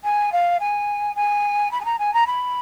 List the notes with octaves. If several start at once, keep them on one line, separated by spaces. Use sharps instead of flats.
G#5
F5
G#5
G#5
B5
G#5
A#5
G#5
A#5
B5